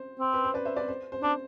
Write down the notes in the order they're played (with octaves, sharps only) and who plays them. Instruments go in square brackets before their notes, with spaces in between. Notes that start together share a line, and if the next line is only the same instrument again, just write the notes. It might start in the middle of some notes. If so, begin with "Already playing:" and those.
Already playing: [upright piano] C5
[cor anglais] C4
[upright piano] B4
C5
B4 D5
C5 E5
B4 D5
C5
C5
[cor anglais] D4 [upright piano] C5